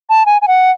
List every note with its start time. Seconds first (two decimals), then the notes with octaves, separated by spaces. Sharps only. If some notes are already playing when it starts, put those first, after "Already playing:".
0.10 A5
0.26 G#5
0.42 G#5
0.48 F#5